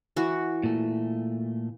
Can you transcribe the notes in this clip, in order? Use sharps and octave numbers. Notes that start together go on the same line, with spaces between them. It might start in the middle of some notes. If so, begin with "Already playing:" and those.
E3 F#4
A#2 A3